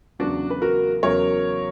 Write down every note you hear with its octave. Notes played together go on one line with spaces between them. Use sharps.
E2 C#3 F#3 D4 F#4
B4
F#4 A#4
E2 C#3 F#3 A#4 C#5